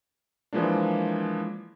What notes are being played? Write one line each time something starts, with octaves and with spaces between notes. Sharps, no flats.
E3 F3 G#3 A#3 D4